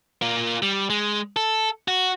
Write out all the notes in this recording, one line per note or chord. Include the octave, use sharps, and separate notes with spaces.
A#3 F4
G3
G#3
A4
F#4